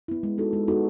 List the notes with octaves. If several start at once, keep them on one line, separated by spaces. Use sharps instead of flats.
B3 E4
G#3
B3 D#4 F#4 A4
G#3
B3 D#4 F#4 A4